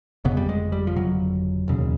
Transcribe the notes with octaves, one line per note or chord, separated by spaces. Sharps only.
G1 F2 C#3 B3
G3
G#3
G3
F3
G1 F2 C#3 F#3
E1 D#2 C#3